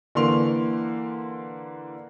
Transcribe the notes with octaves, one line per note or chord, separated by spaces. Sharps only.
D3 E3 A#3 A#4 C6 F7